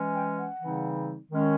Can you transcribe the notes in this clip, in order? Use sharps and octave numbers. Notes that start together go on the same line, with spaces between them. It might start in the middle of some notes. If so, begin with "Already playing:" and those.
Already playing: E3 G#3 C#4
G5
F#5
C#3 E3 G3 C4 D#4
D#3 G#3 C#4